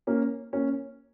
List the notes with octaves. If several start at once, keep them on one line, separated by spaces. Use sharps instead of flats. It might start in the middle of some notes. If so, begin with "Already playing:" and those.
A#3 C#4
A#3 C#4